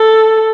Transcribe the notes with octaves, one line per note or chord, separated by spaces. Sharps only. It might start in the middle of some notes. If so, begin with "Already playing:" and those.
Already playing: A4